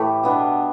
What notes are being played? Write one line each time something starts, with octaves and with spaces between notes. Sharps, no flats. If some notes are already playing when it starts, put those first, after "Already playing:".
Already playing: A2 E3 A3 G4
B2 B3 D4